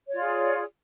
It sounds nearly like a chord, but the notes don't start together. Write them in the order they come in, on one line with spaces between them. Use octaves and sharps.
C#5 D5 F4 G#4